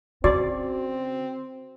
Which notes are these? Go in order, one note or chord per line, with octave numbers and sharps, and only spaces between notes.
C#3 C4 F#4 D5